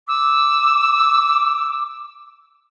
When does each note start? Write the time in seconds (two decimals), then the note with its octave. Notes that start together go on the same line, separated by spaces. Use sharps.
0.08 D6 E6